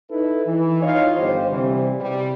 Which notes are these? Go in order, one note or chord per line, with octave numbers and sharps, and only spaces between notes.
D#4 E4 A4 B4
E3
D#4 F4 C#5 D#5 F5
G1 G4 C5
C3 E3 G3
C3 G3